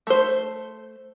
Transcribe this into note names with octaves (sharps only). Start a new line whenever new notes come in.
A3 C5